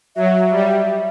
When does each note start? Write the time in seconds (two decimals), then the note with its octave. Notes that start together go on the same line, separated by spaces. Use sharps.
0.16 F#3 E5
0.50 G3